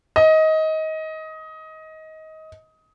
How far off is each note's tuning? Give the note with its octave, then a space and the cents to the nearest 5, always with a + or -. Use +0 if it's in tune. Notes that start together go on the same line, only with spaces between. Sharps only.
D#5 +20